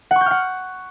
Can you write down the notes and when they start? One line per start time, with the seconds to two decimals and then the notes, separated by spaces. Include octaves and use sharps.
0.11 F#5
0.16 C#6
0.21 G6
0.26 F6
0.31 F#5